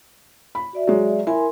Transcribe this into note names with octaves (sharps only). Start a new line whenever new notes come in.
B5
F#4 D5 E5
F#3 G#3
E4 A#4 G#5 C6